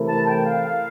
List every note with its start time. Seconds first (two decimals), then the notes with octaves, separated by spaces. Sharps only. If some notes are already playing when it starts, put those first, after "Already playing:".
Already playing: C3 E3 A3 E4 A#4
0.08 A5
0.27 G5
0.46 F5